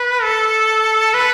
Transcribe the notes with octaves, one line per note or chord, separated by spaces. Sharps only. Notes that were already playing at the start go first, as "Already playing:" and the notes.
Already playing: B4
A4
B4